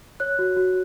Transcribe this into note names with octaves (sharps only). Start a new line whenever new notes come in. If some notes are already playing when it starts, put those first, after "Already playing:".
C#5 F#6
F#4
F#4